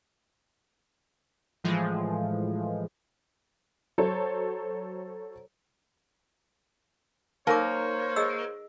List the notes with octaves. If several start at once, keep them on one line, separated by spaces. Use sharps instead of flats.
A2 E3 F3 G#3
F#3 A4 C5 C#5
A#3 D#4 A#4 C5 C#5 D6
G#4 D#5 E6